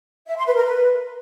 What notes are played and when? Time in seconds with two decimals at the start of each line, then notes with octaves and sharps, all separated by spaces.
0.27 E5
0.37 C6
0.46 B4
0.56 A#4
0.65 B4